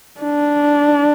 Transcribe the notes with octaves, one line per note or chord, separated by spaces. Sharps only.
D4